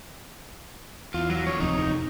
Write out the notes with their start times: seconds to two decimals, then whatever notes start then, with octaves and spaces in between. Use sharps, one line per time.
1.14 E2 F4
1.30 F#3
1.47 D3 C#5
1.60 D1 F2 C3 D#4